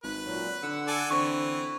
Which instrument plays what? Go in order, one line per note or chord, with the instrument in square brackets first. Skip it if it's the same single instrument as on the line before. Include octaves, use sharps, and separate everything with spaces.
[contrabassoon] G#1 [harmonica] B4
[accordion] A#2 F#3
[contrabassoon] D3 [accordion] F#5 E6
[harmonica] A4 D5 G#5
[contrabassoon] D3 [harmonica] E3 [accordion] C4 [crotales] C#6